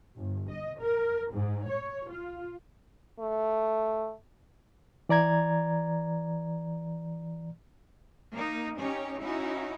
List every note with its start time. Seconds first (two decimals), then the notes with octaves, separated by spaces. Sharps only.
0.17 G1
0.49 D#5
0.81 A#4
1.32 G#2
1.69 C#5
2.10 F4
3.20 A3
5.09 E3 D5 A#5 G#6
8.32 A#3 D#4
8.78 C#4 D#4 G4 C#5
9.20 C#4 D#4 E4 F#4